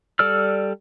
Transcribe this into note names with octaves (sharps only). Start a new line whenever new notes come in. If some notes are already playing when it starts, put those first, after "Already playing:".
G3 A4 D5 E6 F6